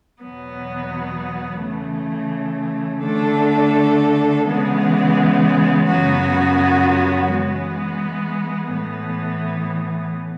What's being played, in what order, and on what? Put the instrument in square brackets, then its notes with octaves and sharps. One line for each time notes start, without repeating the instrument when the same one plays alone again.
[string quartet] E2 B2 F#3 B3
C#3 E3 A3
D3 A3 D4 A4
C#3 E3 G#3 B3
F#2 C#3 F#3 B3 F#4
E3 G#3 B3
A2 E3 B3